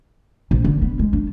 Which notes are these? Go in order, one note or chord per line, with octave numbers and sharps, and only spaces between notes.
A#1
D3
B3
G#3
D4